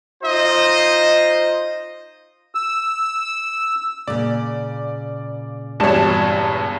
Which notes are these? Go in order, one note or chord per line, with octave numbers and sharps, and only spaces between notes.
D#4 F4 C5 D#5
E6
A#2 C#3 D5
G#1 E2 G2 G3 C#5 A5 E7